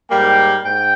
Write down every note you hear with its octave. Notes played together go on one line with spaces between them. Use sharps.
G#2 G3 A#3 G5
G#2 G5